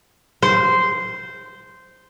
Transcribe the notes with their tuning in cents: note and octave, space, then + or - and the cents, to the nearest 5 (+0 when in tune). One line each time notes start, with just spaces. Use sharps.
C5 -10